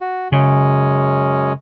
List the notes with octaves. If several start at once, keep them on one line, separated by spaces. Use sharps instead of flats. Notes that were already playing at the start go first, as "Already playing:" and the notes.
F#4
F#2 C#3 G#3 C#4